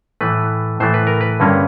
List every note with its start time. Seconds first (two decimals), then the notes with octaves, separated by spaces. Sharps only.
0.21 A2 E3 A3 B4
0.80 A2 E3 A3 C5
0.94 B4
1.07 A#4
1.21 B4
1.40 G2 D3 G3 A#3 C#4